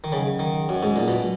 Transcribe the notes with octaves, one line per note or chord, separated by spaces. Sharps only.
D#3
C#3 F#3 C#4 G#4 D#5 F#5
D#3
F#2 F#3 C#4 G#4 D#5 F#5
G#2
A#2
B2
F#3